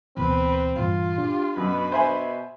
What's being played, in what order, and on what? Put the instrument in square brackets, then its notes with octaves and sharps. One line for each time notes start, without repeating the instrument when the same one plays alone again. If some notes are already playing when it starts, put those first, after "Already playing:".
[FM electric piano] D2 B2 E3 [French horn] C4 [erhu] B4
[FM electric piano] G2 A#2 E3 [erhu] F4
[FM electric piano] D4 [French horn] G4
[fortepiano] F#2 [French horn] B2 [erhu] B4
[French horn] B2 [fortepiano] C5 E5 G#5